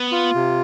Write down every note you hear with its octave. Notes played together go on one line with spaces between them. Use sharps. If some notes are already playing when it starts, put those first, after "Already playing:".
Already playing: B3
F4
C3